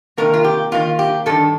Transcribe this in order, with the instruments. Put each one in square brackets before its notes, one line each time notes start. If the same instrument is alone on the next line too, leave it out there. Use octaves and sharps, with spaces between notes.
[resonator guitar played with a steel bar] C3 D#3 A#3 A#4
F4
G4
C3 D#3 A#3 F4
G4
G2 D#3 D4 A4